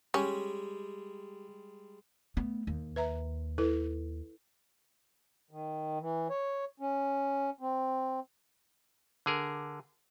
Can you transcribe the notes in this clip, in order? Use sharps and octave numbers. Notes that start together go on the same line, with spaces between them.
G3 G#3 C#4 G4
A3 B3
D#2
B4 E5 A#5
E4 A4 B4
D#3
E3
C#5
C#4
C4
D3 G#4 A#4